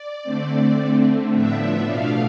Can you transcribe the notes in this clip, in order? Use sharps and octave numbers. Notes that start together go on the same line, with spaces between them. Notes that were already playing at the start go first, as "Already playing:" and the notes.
Already playing: D5
D3 A3 C4
D3 A3 C4
A2 F3 B3 D4 E5
B2 A3 D4 F5